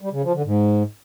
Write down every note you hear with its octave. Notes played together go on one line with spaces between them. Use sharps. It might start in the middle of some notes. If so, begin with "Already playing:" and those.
G3
C#3
F3
D3
G#2